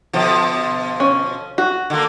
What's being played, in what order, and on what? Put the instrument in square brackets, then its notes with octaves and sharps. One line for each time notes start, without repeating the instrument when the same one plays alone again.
[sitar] B2 D3 F3
[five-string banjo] C#4
F#4
[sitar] D3 A#3